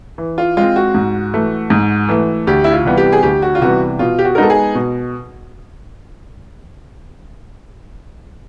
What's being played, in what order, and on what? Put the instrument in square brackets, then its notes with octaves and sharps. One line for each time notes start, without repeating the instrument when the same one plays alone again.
[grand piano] E3
[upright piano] F4
[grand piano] G#3 C4 [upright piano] F4
[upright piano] F#4
[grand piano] G#2
E3 A3
G#2
E3 A3
[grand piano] D2 [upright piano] G4
[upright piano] E4
F4
[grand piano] C3 E3 G3 B3
[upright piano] G4
G#4
[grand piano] D2 [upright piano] G4
[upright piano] F#4
F4
[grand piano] C3 E3 G3 B3 [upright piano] F#4
[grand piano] B2 [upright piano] F4
[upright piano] G4
F#4
A#4
[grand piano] G#3 B3 D#4 [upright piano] A4
[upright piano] G#4
[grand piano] B2